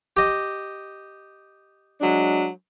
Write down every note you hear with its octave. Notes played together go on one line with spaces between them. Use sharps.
G4 D#5
F#3 G#3 D4